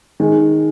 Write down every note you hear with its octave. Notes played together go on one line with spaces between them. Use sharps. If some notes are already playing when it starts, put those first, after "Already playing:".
D#3 G#3